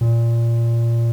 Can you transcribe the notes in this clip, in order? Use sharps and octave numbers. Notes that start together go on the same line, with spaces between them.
A#2